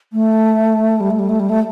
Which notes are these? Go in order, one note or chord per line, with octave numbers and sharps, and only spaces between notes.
A3
G3
A3
G3
A3
G3
A3